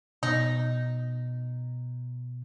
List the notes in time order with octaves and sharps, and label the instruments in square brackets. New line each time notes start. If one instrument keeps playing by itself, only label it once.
[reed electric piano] B2 [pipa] D#4